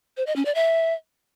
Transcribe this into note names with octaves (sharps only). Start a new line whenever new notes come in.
C5
D#5
C#4
D5
E5